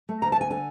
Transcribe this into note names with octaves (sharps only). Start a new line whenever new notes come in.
A3
D2 A#5
A5
D2 G#5
D3 G#5